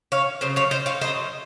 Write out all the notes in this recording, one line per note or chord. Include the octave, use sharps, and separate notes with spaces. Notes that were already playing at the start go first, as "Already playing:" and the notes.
C#5 F5
C#3 F#3 C5 D#5
C#5 F5
C5 D#5
C#5 F5
C#3 F#3 C5 D#5